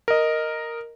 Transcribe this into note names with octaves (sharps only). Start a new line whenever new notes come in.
A#4 D#5